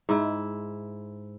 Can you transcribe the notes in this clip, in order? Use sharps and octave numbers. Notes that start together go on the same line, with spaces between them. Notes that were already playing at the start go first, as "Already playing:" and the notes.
G#2 E4